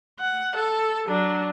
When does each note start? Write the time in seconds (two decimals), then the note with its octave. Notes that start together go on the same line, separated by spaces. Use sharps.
0.19 F#5
0.56 A4
1.07 F#3 D4